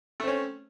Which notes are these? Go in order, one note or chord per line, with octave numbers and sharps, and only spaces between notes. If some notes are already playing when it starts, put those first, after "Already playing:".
A3 C4 C#4